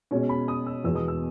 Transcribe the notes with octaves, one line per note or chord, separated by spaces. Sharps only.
B2 G#3 C#4
B5
D#6
E6
E2 B2 G#3 B3 E6
D#6
E6